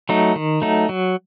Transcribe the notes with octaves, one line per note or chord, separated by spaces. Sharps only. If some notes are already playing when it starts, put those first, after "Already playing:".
F#3 A3 D#4
D#3
F#3 A3 D#4
F#3